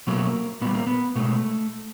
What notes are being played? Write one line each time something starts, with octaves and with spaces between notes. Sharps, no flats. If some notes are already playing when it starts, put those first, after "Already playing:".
B2 F#3 A3 A#3
A#2 G3 B3
A#3
B3
B2 G#3 A3